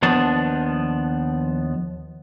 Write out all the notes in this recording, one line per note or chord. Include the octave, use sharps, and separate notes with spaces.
D#2 F3 B3 D4